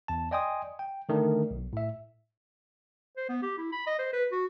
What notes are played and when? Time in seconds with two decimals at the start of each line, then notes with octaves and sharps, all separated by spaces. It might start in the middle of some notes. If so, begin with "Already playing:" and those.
0.08 E2 A5
0.31 D5 D#5 G5 G#5 C6 D#6
0.79 G5
1.09 D3 D#3 A3 D4
1.51 B1
1.73 A2 E5
3.17 C5
3.29 B3
3.42 G4
3.58 E4
3.72 B5
3.87 D#5
3.99 C5
4.13 B4
4.32 F#4